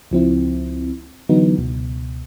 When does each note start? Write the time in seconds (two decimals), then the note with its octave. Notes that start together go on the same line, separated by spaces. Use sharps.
0.11 C#2 F3 C4 E4
1.29 D3 E3 F#3 B3 D#4
1.58 C#2 B2